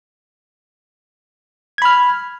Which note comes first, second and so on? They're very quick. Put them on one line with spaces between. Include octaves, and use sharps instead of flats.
G#6 B5 F6